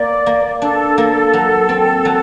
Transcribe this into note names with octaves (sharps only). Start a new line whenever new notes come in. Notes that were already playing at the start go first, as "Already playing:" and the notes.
Already playing: A#3 D5
A#3
D4 A4
A#3
F#3
C4
F#3